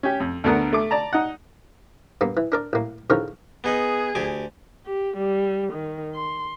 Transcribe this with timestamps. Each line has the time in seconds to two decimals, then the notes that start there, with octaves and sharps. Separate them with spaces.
0.03 C#4 G4
0.20 F2
0.44 D2 D3 B3 A#4 F#5
0.73 A3 D6
0.91 D5 A5 A#5
1.13 D#4 F#5
2.21 G2 A#3 B3
2.37 E3
2.52 D4 A#4 D5
2.73 A1 A#3
3.10 E2 D3 D#3 F3 C#4 A#4
3.64 B3 D#4 G#4 B4
4.15 D2 G4 G#5
4.86 G4
5.17 G3
5.73 D#3
6.15 C6